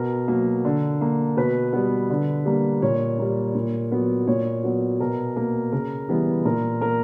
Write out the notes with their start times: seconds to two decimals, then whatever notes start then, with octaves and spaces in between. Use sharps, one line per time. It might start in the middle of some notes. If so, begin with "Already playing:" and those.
Already playing: B2 A#4
0.28 F#3 A#3
0.65 D3
1.01 A#3
1.37 B2 B4
1.73 G3 B3
2.10 D3
2.45 G3 A#3
2.82 A#2 C#5
3.19 G3 A#3
3.55 A#2
3.92 F#3 B3
4.27 A#2 C#5
4.64 F#3 B3
5.00 B2 A#4
5.36 A#3 A#4
5.72 C#3 A#4
6.09 E3 G3 B3
6.45 A#2 A#4
6.81 A#3 A#4